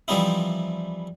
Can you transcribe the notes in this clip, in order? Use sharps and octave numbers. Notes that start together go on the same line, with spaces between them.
E3 F3 G3 C4 D#4 E4